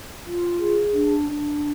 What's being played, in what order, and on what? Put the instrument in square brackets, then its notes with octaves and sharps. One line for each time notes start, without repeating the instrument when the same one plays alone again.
[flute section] F4
G#4
D4
D4